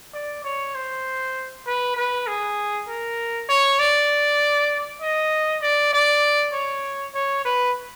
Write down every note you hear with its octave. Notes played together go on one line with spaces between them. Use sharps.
D5
C#5
C5
B4
B4
G#4
A#4
C#5
D5
D#5
D5
D5
C#5
C#5
B4